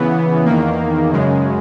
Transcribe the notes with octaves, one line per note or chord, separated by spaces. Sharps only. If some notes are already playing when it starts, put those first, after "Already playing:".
Already playing: C#3 E3 B3
E2 D#3 A#3
F#2 C#3 G#3